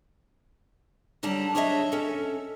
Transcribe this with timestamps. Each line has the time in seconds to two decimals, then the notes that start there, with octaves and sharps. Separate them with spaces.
1.23 D3 F#3 G3 D4 A5 A#5
1.55 D4 G#4 C#5 D#5 E5
1.92 C#4 A4